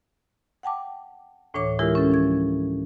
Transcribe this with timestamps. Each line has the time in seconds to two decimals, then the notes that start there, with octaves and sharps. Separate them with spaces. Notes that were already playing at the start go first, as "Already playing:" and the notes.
0.63 F#5 G5 A5 D6
1.54 D2 A2 E3 D4 C#5 D6
1.79 E3 G#3 E4 F4 G4 A#4
1.95 C#4 A4
2.10 F3 D4 G#6